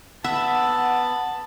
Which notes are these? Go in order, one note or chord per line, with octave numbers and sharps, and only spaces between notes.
B3 E5 F#5 A5 B5